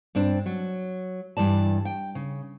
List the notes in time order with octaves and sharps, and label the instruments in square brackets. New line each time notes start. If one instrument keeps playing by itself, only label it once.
[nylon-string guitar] G2 C4 D4
F#3
G2 E3 D5 A5
G5
C#3